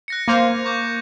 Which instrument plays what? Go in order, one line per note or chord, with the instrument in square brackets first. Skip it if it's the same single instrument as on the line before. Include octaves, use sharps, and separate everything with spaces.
[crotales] F#6 A#6 C#7
[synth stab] A#3 C5 [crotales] G#6 D#7 F7
[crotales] C#6 D6 G6